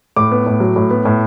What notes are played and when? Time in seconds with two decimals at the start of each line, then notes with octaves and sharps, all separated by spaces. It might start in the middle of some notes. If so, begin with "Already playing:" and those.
0.16 A2 D6
0.32 B3
0.46 A2
0.60 F#3
0.76 A2
0.90 B3
1.05 A2